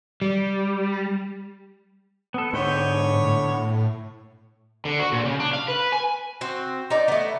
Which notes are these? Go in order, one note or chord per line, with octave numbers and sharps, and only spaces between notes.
G3
B3 A4
G#2 D3 B3 C#5 G5
A2
D3
F#4
A#2
C#3
D4
F5
B4
G#5
C4 F#4
D#4 D5
A3 B3